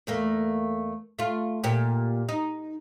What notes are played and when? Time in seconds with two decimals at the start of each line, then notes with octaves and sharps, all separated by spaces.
0.07 E2 A3 A#3
1.19 A3 F4
1.64 A#2 G4
2.29 D#4